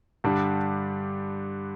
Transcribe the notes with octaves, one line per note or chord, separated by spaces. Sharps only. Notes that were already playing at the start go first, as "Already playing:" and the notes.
G2 D3 G3 D4